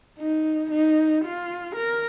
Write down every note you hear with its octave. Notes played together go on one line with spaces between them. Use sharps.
D#4
D#4
F4
A#4